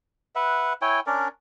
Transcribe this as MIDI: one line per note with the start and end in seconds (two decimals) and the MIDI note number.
0.35 0.73 71
0.35 0.73 76
0.35 0.73 78
0.82 1.00 64
0.82 1.00 73
0.82 1.00 79
0.82 1.00 80
1.07 1.28 61
1.07 1.28 62
1.07 1.28 70
1.07 1.28 74